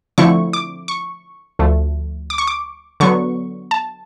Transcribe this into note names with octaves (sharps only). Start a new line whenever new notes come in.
D3 F3 A3 C4 E4 C#6
D6
C#6
D2 D3 F3 A3
D6
C#6
D6
D3 F#3 B3 C#6
A5